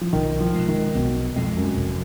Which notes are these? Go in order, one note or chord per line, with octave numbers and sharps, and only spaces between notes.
F3
B1 D#3
F3
B2 G#3
D#3
B1 B2
F2 B2 G#3
F#2
F1